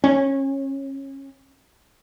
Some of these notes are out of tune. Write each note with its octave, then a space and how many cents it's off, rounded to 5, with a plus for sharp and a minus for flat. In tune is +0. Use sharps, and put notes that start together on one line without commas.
C#4 -25